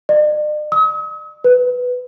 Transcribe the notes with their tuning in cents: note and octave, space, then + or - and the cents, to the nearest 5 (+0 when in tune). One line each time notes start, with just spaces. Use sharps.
D5 +45
D#6 +45
B4 +10